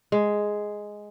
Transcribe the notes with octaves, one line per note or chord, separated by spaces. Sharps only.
G#3